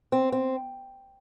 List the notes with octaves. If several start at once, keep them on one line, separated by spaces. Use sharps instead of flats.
C4
C4